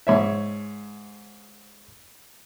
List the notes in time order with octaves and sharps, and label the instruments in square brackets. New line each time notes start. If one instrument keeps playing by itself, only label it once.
[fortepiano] G#2 C#5 E5